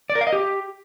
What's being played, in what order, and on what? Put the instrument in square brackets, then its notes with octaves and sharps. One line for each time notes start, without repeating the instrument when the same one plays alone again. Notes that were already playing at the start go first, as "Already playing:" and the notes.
[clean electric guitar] D5
A#4
F5
D#5
G4